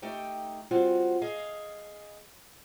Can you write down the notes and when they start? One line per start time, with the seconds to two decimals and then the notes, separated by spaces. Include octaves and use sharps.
0.02 A3 D#4 G4 G5
0.71 G3 C4 F4 F#4
1.22 G#4 D#5 F5